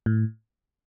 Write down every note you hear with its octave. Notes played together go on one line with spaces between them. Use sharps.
A2